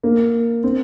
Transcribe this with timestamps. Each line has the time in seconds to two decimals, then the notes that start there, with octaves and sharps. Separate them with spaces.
0.03 A#3
0.63 C4